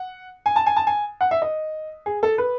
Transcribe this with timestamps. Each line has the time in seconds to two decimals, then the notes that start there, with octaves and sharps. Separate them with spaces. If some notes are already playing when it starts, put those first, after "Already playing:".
Already playing: F#5
0.46 G#5
0.56 A5
0.66 G#5
0.76 A5
0.87 G#5
1.21 F#5
1.31 E5
1.42 D#5
2.06 G#4
2.23 A4
2.38 B4